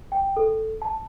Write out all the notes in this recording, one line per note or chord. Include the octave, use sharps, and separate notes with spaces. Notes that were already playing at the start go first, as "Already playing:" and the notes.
G5
A4
A5